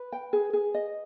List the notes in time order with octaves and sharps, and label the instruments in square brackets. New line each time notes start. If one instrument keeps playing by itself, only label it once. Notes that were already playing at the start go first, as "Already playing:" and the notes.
Already playing: [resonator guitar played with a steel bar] B4
[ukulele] G5
G#4
G#4
D#5